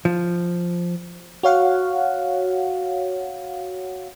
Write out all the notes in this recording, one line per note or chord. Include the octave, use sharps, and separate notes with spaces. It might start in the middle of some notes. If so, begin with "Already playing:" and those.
F3
F#4 C#5 F5 F#5